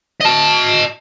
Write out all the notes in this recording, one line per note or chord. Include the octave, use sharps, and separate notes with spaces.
D#5 A5